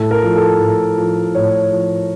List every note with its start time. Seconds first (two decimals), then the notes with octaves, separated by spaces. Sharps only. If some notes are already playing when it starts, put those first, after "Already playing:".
Already playing: A2 A4
0.11 A#4
0.22 F3
0.36 A4
0.60 A2
0.98 F3
1.34 A2 C#5
1.71 F3